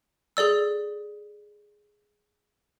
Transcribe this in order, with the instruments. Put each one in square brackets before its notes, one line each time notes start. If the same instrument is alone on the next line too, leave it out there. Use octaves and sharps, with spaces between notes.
[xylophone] G#4 A4 D5 E6